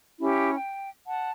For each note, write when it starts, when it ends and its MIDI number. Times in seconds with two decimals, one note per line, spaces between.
0.19 0.54 61
0.19 0.54 64
0.19 0.54 67
0.55 0.88 79
1.05 1.31 78
1.05 1.31 81